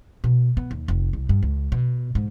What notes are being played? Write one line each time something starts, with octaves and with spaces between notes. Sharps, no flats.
B2
B3
D#2
F1
C2
G2
C#2
B2
G#2